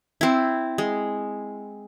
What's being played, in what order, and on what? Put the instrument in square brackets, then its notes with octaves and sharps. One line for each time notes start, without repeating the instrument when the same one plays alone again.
[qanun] C4 E4
G#3